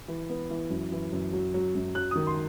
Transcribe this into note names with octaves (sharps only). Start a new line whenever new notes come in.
E3
B3
E3
F#2
E3
F#2
F#3
F#3
F#2
F#3 F#6
D#3 D#6
C6